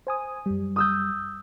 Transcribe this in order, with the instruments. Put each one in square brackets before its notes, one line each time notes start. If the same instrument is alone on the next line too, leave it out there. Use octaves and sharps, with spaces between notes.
[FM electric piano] C5 G#5 D#6
F#2 G3
[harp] D#6 E6 G6